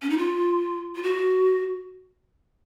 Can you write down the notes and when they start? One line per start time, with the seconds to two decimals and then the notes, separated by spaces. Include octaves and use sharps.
0.02 C#4
0.10 D#4
0.18 F4
0.95 F4
1.03 F#4